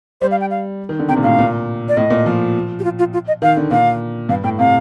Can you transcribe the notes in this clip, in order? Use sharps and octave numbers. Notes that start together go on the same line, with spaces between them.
G3 C5
F5
G5
F5
D#3
D3
C3 G5
A#2
A2 F5
A#2
D5
A2 D#5
A#2
F3
G4
F4
F4
F4
D#5
D#3 F5
D3
A#2 F5
G2 F5
A2 G5
C3 F5